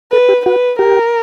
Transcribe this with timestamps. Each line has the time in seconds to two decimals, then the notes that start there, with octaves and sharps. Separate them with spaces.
0.12 A4 B4
0.29 G4
0.46 F#4 B4
0.79 G4 A#4